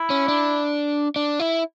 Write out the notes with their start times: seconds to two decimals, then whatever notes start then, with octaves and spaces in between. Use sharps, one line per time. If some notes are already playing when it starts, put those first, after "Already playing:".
Already playing: E4
0.10 C#4
0.28 D4
1.16 D4
1.40 E4